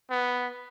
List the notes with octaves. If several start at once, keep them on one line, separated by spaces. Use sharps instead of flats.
B3